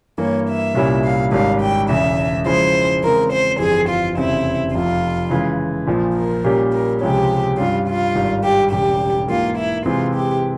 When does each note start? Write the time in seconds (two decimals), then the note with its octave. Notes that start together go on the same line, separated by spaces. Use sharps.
0.18 G2 E3 A#3 C#5
0.47 E5
0.75 C2 A#2 G3 C#4 E4
1.04 F5
1.32 G#1 G#2 G3 C#4 G4 F5
1.60 G5
1.89 E1 E2 C#3 E5
2.45 C#3 F3 G#3 E4 C5
3.03 C#3 E3 G#3 C4 A#4
3.31 C5
3.59 G1 F2 E3 G3 C4 G#4
3.88 F4
4.16 F1 E2 C#3 G3 C4 E4
4.73 F1 F2 C3 F4
5.30 C#3 E3 G#3
5.87 A#1 A#2 F3
6.15 A#4
6.44 A#2 G3 C#4 G4
6.72 A#4
7.00 C#2 C3 F3 G#3 C#4 G4
7.58 G2 G3 C#4 F4
7.87 F4
8.15 G#1 G2 G3
8.43 G4
8.71 E1 E2 C#3 G3 G4
9.28 G#2 E3 A#3 F4
9.57 E4
9.85 C3 E3 G#3 C4 F4
10.14 G4